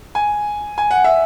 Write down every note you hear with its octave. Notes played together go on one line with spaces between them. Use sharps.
G#5
G#5
F#5
E5